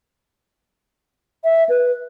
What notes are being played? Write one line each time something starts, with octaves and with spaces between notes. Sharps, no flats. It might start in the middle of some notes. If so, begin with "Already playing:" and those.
E5
B4